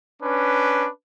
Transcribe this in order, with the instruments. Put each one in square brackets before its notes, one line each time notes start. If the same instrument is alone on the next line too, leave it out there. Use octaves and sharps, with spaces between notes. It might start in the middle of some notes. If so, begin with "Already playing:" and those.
[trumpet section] C#4 D4 B4